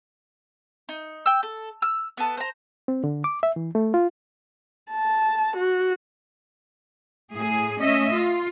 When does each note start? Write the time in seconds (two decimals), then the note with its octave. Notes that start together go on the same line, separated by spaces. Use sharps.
0.89 D#4
1.26 G5 E6
1.43 A4
1.82 E6 F6
2.17 B3 A4
2.37 C5 A#5
2.88 C4
3.04 D3
3.24 D6
3.43 E5
3.56 E3
3.75 A3
3.94 F4
4.91 A5
5.57 F#4
7.33 A2 G#4
7.79 A3 C#4 D#5 E5
8.13 F4